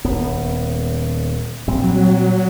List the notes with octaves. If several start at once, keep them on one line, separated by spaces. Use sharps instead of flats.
D#1 B3
A#2 G3 C4
F#3